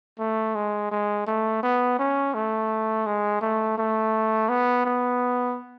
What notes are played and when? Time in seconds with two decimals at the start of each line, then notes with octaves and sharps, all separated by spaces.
0.19 A3
0.55 G#3
0.91 G#3
1.27 A3
1.63 B3
1.99 C#4
2.34 A3
3.06 G#3
3.42 A3
3.78 A3
4.49 B3
4.86 B3